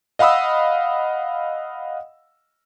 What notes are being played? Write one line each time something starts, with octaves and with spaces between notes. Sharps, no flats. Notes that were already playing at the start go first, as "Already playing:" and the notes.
D#5 F5 F#5 B5 D#6 E6